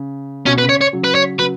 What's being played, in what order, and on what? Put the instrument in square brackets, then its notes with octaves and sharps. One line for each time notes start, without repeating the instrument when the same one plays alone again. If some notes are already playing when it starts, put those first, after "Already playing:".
Already playing: [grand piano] C#3
[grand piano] B2 [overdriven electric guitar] C#4
[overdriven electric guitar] B4
[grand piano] C#3
[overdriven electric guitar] C#5
C#5
[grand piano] C#3 F#3
[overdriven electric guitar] B4
C#5
[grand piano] C#3 F#3 [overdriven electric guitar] B4